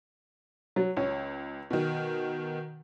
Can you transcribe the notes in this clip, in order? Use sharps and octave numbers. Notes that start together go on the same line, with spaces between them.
F#3
C#2 C#4
B2 D#3